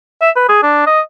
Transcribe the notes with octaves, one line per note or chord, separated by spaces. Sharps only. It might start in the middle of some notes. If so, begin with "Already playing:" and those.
E5
B4
G#4
D4
D#5